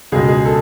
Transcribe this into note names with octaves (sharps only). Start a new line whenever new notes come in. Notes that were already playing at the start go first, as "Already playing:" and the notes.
C#2 B2 G#3 G#4
G#4
A4